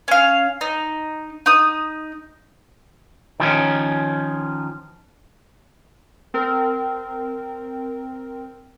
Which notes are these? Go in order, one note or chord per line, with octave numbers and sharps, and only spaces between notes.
C#4 F5
D#4
D#4 D#6
D#3 F3 C#4
C4 A#4